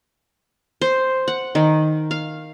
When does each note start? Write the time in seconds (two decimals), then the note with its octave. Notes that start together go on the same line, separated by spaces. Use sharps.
0.81 C5
1.28 F#5
1.55 D#3
2.11 F5